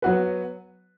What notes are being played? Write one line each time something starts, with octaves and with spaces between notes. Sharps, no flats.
F#3 B3 F#4 B4